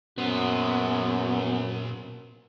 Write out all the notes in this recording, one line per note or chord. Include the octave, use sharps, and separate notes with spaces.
F#2 A#2 B3 C5